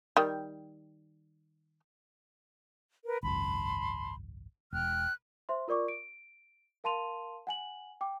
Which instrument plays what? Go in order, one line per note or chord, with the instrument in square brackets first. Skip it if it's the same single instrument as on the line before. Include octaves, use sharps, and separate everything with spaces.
[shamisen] D#3 G3
[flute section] A#4 B4
[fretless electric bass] G#1 C#2 F#2 [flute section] A5 B5 C6
[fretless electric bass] E1 [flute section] G5 F6 F#6
[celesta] C5 E5 C6
F4 A#4 D5 C#6 D6
D7
A#4 F5 A5 C6 D#7 F7
F#5 G#5 F#7
G5 D6